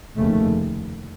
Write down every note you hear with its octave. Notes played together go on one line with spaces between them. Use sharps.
F1 D#2 C#3 A3